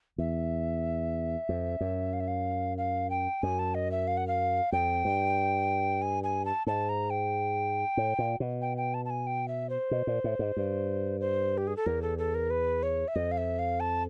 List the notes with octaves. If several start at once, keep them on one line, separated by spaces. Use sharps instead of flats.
E2 E5
F2
F#2
F5
E5
F5
F5
G5
F#2 G#5
A5
D#5
E5
F5
F#5
F5
F2 G5
G2
G#5
G#5
A5
G#2 A5
A#5
G5
A2
A#2
B2
G5
G5
A5
A5
G#5
G5
E5
C5
B2
A#2
A2
G#2
G2
C5
G4
G#4
A4
E2 A#4
A4
A4
A#4
B4
C#5
E5
F2 D#5
F5
E5
F5
A5